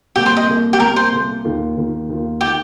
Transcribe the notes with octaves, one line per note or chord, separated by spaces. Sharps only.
C2 A#2 A#3 G4
C5
D#5
C2 A#2 A#3
G4
C2 A#2 A#3 A#4
C5
C2 A#2 A#3
D#2 D#3 A#3 F4
D#2 D#3 A#3 F4
D#2 D#3 A#3 F4
D#3 A#3 F4 G4